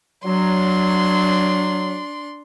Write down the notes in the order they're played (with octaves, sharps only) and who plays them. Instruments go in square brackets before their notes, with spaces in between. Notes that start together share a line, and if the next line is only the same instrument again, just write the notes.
[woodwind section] F#3 [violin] D4 C6